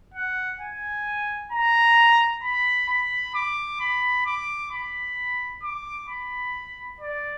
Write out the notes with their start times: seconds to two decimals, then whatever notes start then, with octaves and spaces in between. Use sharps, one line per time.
0.14 F#5
0.60 G#5
1.52 A#5
2.43 B5
2.89 B5
3.35 D6
3.80 B5
4.26 D6
4.72 B5
5.63 D6
6.09 B5
7.01 D5